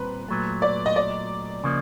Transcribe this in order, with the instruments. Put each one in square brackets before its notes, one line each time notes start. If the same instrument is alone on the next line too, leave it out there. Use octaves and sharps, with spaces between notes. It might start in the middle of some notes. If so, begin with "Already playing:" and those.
Already playing: [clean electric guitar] A#2 G3 C4 [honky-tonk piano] B4
[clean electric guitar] A#2 F#3 A3
[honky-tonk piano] D5
D#5
D5
[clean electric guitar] C#3 F3 A#3